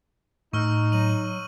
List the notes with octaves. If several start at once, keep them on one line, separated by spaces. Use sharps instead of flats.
A2 D#4 C#6 E6 F6
F#3 D#7 F#7